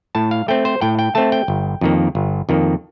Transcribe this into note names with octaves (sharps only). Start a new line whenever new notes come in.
A2 A5
F5
A3 C4 G5
C5
A2 G5
G5
A3 C4 A5
G5
G1
F2 D#3 A#3
G1
F2 D#3 A#3